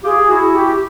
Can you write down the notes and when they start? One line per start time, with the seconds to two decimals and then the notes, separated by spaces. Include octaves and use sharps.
0.04 F4 G4 G#4
0.29 E4 F#4
0.52 G4